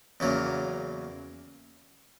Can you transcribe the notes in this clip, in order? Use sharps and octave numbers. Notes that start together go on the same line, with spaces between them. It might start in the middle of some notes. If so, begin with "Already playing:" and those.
E2 C#3 F#3 A#3